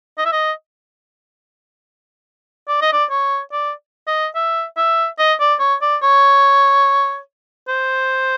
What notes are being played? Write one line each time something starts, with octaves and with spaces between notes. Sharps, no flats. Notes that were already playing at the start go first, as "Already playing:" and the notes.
D#5
E5
D#5
D5
D#5
D5
C#5
D5
D#5
E5
E5
D#5
D5
C#5
D5
C#5
C5